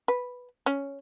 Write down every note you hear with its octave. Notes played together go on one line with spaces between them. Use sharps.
B4
C#4